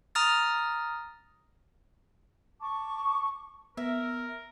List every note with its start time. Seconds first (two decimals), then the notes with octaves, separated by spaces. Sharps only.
0.15 A#5 D#6 F6 A6
2.61 A5 C#6 D6
3.77 B3 A#4 E5